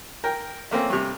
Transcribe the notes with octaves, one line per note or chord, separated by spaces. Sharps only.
A#4 G5
A3 A#3 C4 C#4
G2 C3